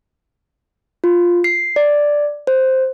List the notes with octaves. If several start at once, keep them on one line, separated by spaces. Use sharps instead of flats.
F4
C7
D5
C5